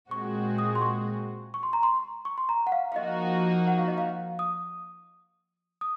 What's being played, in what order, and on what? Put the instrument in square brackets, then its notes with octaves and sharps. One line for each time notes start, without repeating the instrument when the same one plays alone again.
[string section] A#2 G#3 C4 F#4 [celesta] C#6
[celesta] D#6
C6
C#6
C#6
C6
A#5
C6
C#6
C6
A#5
F#5
F5
F5
[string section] F3 A#3 D#4 F#4 [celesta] D#5
[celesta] F#5
F5
D#5
F5
D#6
D#6